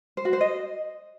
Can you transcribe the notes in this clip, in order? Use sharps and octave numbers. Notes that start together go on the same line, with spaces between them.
C5
F#4
C5
D#5